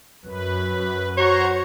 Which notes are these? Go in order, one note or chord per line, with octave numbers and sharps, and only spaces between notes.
F#2 B4
F#4 C5 C#5 A#5